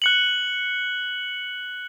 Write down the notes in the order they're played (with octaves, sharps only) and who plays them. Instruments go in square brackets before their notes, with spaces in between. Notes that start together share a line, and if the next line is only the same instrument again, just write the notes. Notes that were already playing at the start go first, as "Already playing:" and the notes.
[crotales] F#6 C#7 F#7